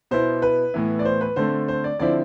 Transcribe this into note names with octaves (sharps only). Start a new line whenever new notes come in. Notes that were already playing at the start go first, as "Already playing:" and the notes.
B2 B3 E4 C5
B4
A2 E3 B3 E4
D5
C5
B4
D3 A3 C4 C5
C5
D5
D3 F3 C4 E4 D5